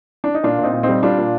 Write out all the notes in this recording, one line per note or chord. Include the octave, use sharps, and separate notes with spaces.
D4
D#4
A#2 D4 F4
A#2
C4 D#4
A#2
C4 D#4
G3
G3 D4 F4
A#2